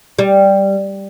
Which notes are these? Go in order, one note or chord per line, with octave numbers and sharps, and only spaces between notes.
G3